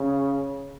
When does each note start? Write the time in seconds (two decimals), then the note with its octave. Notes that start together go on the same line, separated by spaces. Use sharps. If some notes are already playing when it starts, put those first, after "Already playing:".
Already playing: C#3